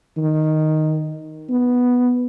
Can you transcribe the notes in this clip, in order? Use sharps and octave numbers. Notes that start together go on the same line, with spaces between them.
D#3
B3